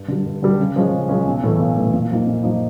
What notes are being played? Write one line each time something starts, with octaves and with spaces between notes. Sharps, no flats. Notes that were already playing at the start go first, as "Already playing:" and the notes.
Already playing: G2
D3 G3
G2
D3 G3
C#3
F3 G#3 C#4
C#3
F3 G#3 C#4
B1
A2 E3 A3
B1
A2 E3 A3
A#2
F3 A#3 D#4
A#2
F3 A#3 D#4